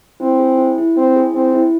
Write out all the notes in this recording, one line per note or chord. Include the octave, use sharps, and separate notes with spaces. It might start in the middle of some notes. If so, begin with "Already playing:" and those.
C4 E4
G#4
E4
E4
C4 E4
G#4
C4 E4
E4